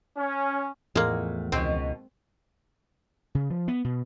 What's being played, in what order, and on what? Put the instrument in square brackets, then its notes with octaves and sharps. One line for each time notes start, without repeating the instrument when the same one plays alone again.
[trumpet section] C#4
[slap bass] E2 F3 [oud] A2 [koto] G#3 A#3
[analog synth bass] C#2 [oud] B2 D#3 [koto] C4
[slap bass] C#3
F3
B3
B2